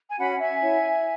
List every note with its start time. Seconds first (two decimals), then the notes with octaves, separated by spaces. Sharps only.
0.09 G#5
0.18 C#4 F#4 C#5 F#5 B5
0.39 E5 G#5
0.61 E4 C#5